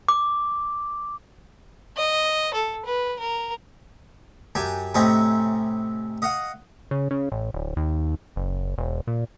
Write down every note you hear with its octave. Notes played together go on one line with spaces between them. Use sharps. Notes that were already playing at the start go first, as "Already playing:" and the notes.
D6
D#5
A4
B4
A#4
F#2 G4 G#5 A5
A2 C3 C4 C#4 D#4
D#5 F5 F#5 D#6
C#3
C#3
A1
D1
D#2
F#1
E1
A#2